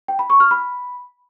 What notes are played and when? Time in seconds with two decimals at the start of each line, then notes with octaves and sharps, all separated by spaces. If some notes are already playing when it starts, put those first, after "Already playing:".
0.08 G5
0.19 B5
0.30 C#6
0.40 F6
0.51 B5